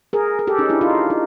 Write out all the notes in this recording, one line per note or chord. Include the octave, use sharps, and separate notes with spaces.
G#4 A#4
A#4
G4 A4
C#4 D#4
D4 E4
D#4 F4
D#4